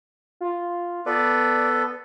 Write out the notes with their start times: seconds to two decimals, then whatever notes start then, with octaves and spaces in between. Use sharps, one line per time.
0.41 F4
1.06 B3 A4 B4 D5